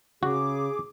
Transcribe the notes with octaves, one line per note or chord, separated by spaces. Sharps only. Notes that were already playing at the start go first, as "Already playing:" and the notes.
C#3 F#4 G#4 D6